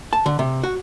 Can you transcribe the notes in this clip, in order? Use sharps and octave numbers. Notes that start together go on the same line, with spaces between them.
A5
D3
C3
F#4